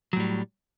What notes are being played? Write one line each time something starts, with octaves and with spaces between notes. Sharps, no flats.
A2 F#3 G3